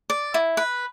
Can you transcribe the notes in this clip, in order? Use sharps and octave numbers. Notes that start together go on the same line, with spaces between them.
D5
E4
B4